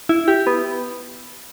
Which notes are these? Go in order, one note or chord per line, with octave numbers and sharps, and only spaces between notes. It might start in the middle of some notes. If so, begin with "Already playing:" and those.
E4
G4
B3